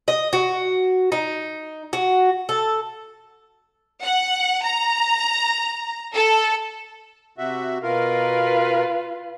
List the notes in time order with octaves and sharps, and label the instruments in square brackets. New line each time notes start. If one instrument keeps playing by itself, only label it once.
[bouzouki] D#5
F#4
D#4
F#4
A4
[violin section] F#5
A#5
A4
[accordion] C3 F#4 E5
[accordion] B2 A#4 [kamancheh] F4 B4